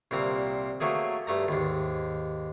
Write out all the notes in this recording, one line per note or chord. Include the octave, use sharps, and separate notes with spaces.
C2 A#2 C4 A#5
F#3 A3 A#3 G#4
G2 A3 A#5
D#2 G#2